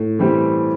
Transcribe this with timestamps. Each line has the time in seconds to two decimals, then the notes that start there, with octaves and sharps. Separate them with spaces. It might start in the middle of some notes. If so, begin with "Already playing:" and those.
Already playing: A2
0.19 E3 G3 C4 G4